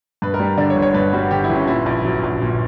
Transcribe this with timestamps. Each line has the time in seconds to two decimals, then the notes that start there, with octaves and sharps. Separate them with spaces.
0.22 G2 B4
0.34 A#4
0.40 G3
0.58 D3 D5
0.70 C#5
0.76 G1
0.82 C#5
0.94 G2 B4
1.13 G3 F#4
1.31 D3 G4
1.44 E4
1.50 G1
1.55 C#4
1.67 A#2 E4
1.86 A#1
2.05 F#3
2.23 A#1
2.42 A#2